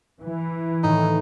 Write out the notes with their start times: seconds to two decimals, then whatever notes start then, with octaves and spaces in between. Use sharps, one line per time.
0.22 E3
0.83 A2 D#3 D#4